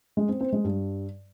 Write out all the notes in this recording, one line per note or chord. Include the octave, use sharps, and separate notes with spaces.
G#3
C4
C4
G#3
G2